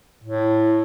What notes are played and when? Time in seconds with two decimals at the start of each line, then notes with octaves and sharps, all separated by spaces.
0.24 A2